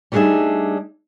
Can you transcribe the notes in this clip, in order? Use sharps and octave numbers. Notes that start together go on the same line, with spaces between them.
G3 A3 D4 D#4 G#4 E5